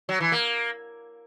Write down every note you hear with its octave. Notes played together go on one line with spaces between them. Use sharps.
F#3
E3
A#3